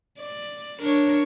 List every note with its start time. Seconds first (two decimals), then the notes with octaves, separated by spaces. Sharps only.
0.19 D5
0.80 D4 A#4 C#5